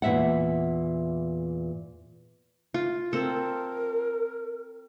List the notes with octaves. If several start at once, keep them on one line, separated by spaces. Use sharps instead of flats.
E2 A#2 E5 F#5
F4
C4 A4 A#4